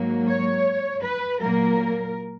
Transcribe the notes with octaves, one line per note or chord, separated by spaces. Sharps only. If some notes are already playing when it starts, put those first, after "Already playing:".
Already playing: G#2 F#3 A#3
C#5
B4
A#2 F#3 A#3 A#4